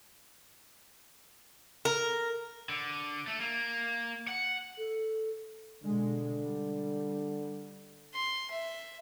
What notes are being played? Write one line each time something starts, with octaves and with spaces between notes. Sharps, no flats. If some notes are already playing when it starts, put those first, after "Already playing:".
A#4
D3
A3
A#3
F#5
A4
B2 D3 G#3
G3
C6
E5